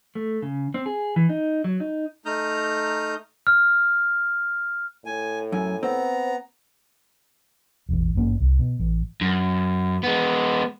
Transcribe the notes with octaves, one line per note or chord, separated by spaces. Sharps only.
A3
C#3
C4
G#4
E3
D#4
F#3
D#4
A3 D#4 A#5 D#6 F6 G6
F6
A2 G#5
F#2 G#5
B3 C4 A#5
E1 A1
G#1 G2 A#3 C#4
C2
B2
A1
F#2
G#3 B3